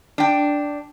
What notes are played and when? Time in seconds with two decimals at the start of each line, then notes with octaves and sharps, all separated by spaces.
0.18 D4 G5